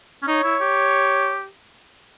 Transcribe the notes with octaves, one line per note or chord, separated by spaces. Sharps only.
C#4
D#4 C#5
E4
G4